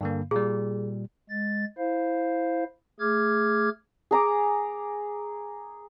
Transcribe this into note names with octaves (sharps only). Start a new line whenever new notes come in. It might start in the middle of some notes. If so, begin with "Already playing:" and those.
G2 D3 A#3
A#2 G3 G#4
G#3 A6
E4 C5 F5
A3 G#4 D6 F6 G#6
G#4 A#5 D6